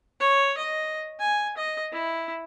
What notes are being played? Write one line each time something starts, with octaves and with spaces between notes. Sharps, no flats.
C#5
D#5
G#5
D#5
E4